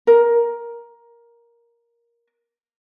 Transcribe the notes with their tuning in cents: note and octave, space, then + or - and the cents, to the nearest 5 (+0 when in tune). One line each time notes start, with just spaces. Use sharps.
A#4 +10